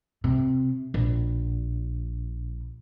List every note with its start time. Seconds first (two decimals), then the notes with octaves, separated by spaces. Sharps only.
0.24 C3
0.94 A#1